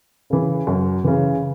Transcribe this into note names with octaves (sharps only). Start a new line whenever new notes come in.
C#3 E3
F#2
C#3 E3